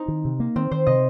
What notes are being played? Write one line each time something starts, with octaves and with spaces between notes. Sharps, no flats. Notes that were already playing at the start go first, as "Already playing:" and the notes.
Already playing: C4 D#4
D#3
C3
A#3
D#3 C4
D#3 C5
C3 D#5